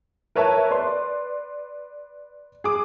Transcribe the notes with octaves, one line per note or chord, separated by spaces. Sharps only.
A#4 B4 C#5 E5 A5
B4 D5 C6
G#4 D6